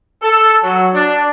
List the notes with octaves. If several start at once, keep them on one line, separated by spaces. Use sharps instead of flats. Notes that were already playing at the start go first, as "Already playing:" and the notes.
A4
F#3
D4